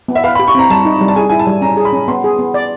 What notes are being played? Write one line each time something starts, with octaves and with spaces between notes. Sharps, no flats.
B3
E5
B4 F5
B5
G4
C#6
C4 A#5
G3 A5
D#4
G3
A5
G#4 G#5
E4 G#5
A5
G3
C#4 A#5
G#4
B5
C#4
B3 C6
G#4
B3
D5